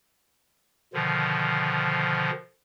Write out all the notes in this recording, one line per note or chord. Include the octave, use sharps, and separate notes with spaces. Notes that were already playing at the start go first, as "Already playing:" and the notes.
B2 D3 D#3 F3